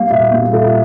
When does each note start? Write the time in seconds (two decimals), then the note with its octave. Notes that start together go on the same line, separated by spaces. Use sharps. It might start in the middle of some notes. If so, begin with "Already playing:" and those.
Already playing: G3 A#3 F5
0.11 A#2 E5
0.31 G3 A#3
0.52 A#2 A4